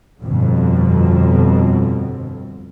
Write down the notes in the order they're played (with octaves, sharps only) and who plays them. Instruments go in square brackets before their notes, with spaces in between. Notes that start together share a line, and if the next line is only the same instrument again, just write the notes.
[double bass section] G1 F2 B2 D3